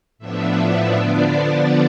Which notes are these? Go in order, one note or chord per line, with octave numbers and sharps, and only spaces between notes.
A2 F3 B3 D4 E5
E5
D3 F3 B3 D4 D5